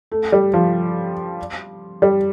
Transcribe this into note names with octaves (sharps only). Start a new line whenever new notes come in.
A3
G3
F3
G3